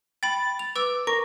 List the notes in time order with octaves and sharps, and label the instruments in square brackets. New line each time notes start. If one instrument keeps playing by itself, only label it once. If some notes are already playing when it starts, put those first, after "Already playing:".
[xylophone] G5 B5 [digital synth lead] A6
[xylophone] F7
[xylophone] B4 E6 [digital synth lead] D6
[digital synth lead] A#4 [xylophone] C#6